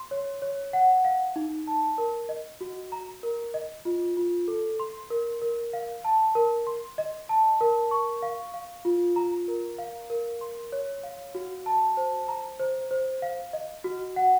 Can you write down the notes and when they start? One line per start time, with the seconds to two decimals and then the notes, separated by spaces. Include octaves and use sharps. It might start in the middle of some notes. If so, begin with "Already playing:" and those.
Already playing: C6
0.11 C#5
0.42 C#5
0.73 F#5
1.05 F5
1.36 D#4
1.67 A5
1.98 A#4
2.29 D#5
2.61 F#4
2.92 A#5
3.23 A#4
3.54 D#5
3.85 F4
4.17 F4
4.48 A4
4.80 C6
5.10 A#4
5.42 A#4
5.73 F5
6.05 A5
6.35 A#4
6.67 C6
6.98 D#5
7.29 A5
7.61 A#4
7.91 C#6
8.22 F5
8.54 F5
8.85 F4
9.16 A#5
9.48 A#4
9.79 F5
10.10 A#4
10.41 C6
10.72 C#5
11.03 F5
11.35 F#4
11.66 A5
11.97 C5
12.28 A#5
12.60 C5
12.91 C5
13.22 F5
13.53 D#5
13.84 F#4
14.16 F#5